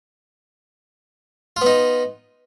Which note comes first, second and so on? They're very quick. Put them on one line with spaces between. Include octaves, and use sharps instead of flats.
F4 B3 D#4